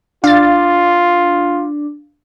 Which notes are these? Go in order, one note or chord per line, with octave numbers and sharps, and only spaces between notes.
D4 F4 F5 A6